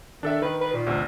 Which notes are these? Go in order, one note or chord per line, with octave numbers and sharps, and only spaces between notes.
D#3 D4 A4 E5
D#3 B4
B4
A#2
A1 D2 C3